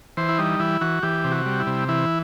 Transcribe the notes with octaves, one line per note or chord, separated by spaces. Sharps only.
E3 C5
E4
G3 D#4
E3 E4
E3 F#4
E3 G4
C3
F#4
G3
E4
C3
E3 E4